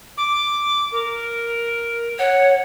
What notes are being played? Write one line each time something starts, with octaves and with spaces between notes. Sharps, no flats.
D6
A#4
C#5 F#5